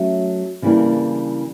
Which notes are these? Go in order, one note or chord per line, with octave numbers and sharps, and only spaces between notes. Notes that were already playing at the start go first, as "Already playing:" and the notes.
Already playing: F#3 A3 C#4
C#3 E3 G3 A#3 D4